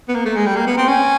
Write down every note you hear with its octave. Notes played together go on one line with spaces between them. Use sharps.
B3
A#3
A3
G#3
G3
A#3
B3
C4
C#4